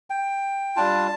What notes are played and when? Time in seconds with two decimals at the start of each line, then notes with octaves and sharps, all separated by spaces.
0.10 G5
0.76 G3 D4 F4 A5